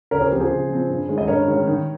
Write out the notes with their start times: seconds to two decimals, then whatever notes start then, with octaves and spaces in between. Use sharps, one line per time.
0.11 C#3 A#4 C#5
0.21 G#4 C5
0.31 F3 C4 G4 A#4
0.40 G#4 C5
0.50 C#3
0.69 F3 C4
0.89 G2
1.08 D#3 G#3 C#4
1.18 D#5
1.27 G2 A#4 C#5
1.48 D#3 G#3 C#4
1.67 D#3